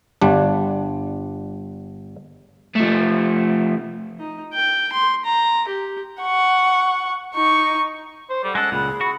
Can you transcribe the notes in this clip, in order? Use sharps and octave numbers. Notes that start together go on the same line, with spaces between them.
G1 G3 D4
F3 A3
D#4
G5
C6
A#5
G4
F#5 C#6
D#4 C#6
C5
G3 A4 F#5
G#3 C#4 A4 F#5 F#6
C#2 A#2 G#4 B5
F#4